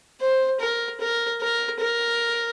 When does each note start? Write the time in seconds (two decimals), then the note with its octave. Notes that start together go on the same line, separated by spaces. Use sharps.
0.21 C5
0.60 A#4
1.01 A#4
1.41 A#4
1.80 A#4